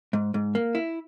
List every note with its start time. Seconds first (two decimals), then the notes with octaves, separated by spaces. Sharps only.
0.13 G#2
0.34 G#2
0.55 A#3
0.75 E4